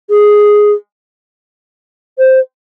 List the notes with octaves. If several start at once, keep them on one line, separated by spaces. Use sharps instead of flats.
G#4
C5